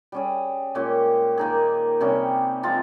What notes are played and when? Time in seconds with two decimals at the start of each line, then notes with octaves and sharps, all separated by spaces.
0.12 G3 C#4 G#4
0.75 A#2 G#3 C#4 G4
1.38 D#3 A#3 D#4 G#4
2.01 C3 G3 C#4
2.63 F3 G#3 C4 F4